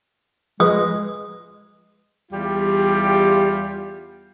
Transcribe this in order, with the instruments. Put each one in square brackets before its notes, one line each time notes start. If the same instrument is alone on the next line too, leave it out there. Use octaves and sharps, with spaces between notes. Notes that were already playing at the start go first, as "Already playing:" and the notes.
[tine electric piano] F3 B4 [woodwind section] G#3 [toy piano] D#6
[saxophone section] E2 G3 F4 G4